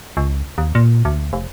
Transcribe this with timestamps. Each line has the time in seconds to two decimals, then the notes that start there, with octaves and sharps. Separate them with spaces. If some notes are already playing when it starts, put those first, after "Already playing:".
0.17 C#2
0.58 D#2
0.75 A#2
1.05 D2
1.33 F1